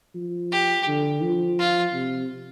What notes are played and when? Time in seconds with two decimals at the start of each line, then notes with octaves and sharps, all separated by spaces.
0.15 F3
0.52 G4
0.87 D3
1.23 F3
1.59 F4
1.94 C3